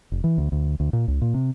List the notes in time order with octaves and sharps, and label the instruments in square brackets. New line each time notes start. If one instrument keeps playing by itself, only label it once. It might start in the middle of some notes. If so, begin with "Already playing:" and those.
[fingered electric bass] F1
E3
D2
D2
D2
A#2
C#2
A#2
C3